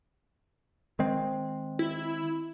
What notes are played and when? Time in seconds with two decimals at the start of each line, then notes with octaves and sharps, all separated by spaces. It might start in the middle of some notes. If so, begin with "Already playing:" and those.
0.99 D#3 G#3 C4
1.79 E4